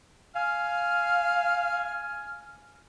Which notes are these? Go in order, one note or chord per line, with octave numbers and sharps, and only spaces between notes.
F5 G#5 F6